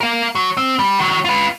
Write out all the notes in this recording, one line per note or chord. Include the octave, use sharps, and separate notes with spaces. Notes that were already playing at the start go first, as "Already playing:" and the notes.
A#4 F5
F#3
C4
G3
D#3 F#3
F4 B4